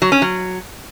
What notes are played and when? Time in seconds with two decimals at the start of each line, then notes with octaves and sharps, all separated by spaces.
0.02 F#3
0.12 C#4
0.22 F#3